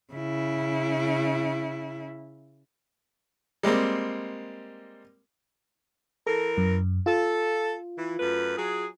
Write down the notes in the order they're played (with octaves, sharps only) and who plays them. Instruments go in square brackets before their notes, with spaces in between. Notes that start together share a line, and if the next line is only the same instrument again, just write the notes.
[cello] C#3 E4
[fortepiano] G3 G#3 A#3 C4
[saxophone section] E3 A#4 [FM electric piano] A4
[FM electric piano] F#2
[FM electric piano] F4 [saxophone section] A4
[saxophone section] E3
F#2 A3 B4
F#3 G#4